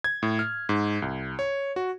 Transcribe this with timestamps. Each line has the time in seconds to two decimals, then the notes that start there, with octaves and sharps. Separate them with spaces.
0.04 G#6
0.23 A2
0.39 F6
0.69 G#2
1.02 C2
1.39 C#5
1.76 F#4